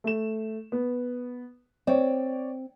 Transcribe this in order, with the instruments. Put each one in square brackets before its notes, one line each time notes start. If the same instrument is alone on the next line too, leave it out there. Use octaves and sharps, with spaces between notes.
[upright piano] A3 E7
B3
[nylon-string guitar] C4 [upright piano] C#5 D5